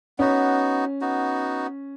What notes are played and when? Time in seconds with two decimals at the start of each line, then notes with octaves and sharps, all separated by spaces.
0.19 B3 C#4 D#4 F#4
1.01 B3 D#4 F#4